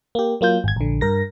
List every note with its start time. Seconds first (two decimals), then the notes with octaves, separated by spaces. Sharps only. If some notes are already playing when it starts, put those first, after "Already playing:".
0.15 A#3 G4
0.41 F#3 A#3 F4 G6
0.64 G#1 G#6
0.76 A#1 D3
1.01 G2 A#4 A#6